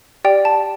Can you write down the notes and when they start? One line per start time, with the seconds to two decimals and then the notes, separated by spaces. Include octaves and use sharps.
0.25 G4 D5 G5
0.45 A5